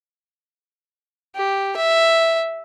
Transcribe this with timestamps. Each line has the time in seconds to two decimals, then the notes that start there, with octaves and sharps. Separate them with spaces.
1.36 G4
1.77 E5